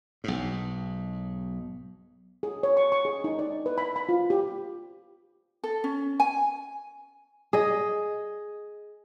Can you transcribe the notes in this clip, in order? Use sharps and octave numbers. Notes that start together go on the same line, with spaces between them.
B1 G#2
G#4
C#5
C#6
C#6
G#4
D#4
D5
B4
B5
B5
F4
G4
A4
C#4
G#5
G#4 D#5